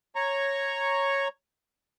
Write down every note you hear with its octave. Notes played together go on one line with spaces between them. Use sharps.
C#5 A#5 C#6